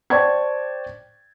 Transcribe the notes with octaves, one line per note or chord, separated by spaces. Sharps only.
C5 D5 G5 A5 C#6 G#6